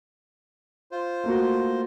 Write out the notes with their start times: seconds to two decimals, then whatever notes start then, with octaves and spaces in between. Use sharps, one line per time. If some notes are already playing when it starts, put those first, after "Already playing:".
0.91 F4 C5
1.24 A3 A#3 F#4